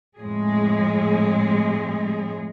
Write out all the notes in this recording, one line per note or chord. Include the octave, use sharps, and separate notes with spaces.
F2 A2 G#3 G#4